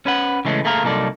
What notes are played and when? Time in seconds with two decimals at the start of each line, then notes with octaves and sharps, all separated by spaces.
0.06 C#4 B4 F#5
0.45 C#3 E3 G#3 A3 C#4
0.64 D2 A3 A#3 G#4 A#4
0.83 C2 F#3 A#3 D#4 A4 D5